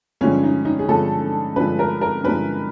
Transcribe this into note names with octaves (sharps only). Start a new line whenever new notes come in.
G2 D3 F3 G#3 C#4
D#4
D#4
G#4
G2 D3 F3 G#3 A4
G2 D3 F3 G#3 B4
A#4
A#4
G2 D3 F3 G#3 B4